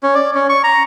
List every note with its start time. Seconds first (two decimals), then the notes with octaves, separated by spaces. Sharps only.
0.03 C#4
0.15 D5
0.35 C#4
0.49 C#6
0.64 A#5